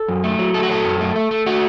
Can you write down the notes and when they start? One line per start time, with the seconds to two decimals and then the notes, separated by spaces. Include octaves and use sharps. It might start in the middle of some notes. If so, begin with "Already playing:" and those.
Already playing: A4
0.08 F#2
0.24 A3
0.39 F#3
0.54 A3 A4
0.63 F#4
0.69 F#3 A4
0.85 F#2
1.01 A3
1.16 A3
1.31 A3
1.46 A3 F#4